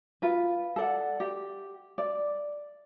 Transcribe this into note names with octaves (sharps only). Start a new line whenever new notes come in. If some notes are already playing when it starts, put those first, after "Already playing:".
F4 B4
A4 D5 F#5
G4
D5